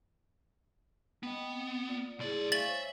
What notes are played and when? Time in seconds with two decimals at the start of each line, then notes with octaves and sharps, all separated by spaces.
1.23 B3 D#5 G5 B5
1.53 C4
1.87 A#3 F4 D5
2.19 B1 A3 E4 G#4 D5
2.52 E5 F5 G#5 C#6 A6 F#7
2.67 C5 C#5